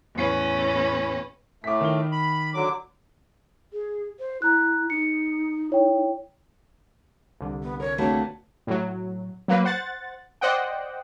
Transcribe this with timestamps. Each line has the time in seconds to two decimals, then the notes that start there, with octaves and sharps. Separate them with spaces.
0.15 E2 A2 C#4 B4
1.64 A2 A3 D6 B6
1.81 D#3 G7
2.12 B5
2.54 D3 F#3 D6
3.73 G#4
4.19 C5
4.42 E4 A#5 F#6
4.90 D#4 C#7
5.70 E4 C#5 G5
7.41 C2 D3
7.63 B3
7.80 A#4 C#5
7.98 A3 A#3 C4 D4 F#4 B4 C#5
8.67 A2 F#3
9.48 F#3 A#3 B4
9.64 C5 F#5 A6
10.41 C5 D5 D#5 F#5 G5